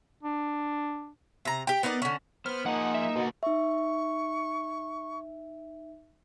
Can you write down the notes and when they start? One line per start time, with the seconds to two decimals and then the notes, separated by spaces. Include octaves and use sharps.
0.23 D4
1.45 C3 A#5
1.67 G4 G5
1.83 B3 D#4 A#4 D5
2.02 D3 C#4
2.46 B3 C5 F6
2.66 F3 A#3 D#4 G#4 F#5
2.94 E5
3.15 B2 D3 F#4
3.43 D#4 E5 C#6